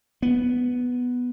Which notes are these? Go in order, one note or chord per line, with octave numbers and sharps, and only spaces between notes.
B3